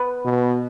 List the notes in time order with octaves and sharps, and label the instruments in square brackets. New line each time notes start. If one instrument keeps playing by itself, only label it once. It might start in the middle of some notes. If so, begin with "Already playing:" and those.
Already playing: [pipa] B3 B4
[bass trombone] B2